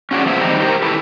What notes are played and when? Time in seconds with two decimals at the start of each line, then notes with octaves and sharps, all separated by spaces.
0.11 C#4 F4 F#4 G#4 D5
0.25 F3 B3 G#4 E5 F5
0.40 D#3 G3 C4 D#4
0.60 G4 A#4 C5
0.82 D#3 E4 G4 A4 B4